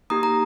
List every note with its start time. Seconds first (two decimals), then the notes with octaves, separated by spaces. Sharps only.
0.10 A#3 D#4 G4 A#5 D#6
0.23 A#5